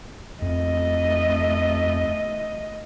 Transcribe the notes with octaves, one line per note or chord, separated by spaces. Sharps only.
F2 A3 D#5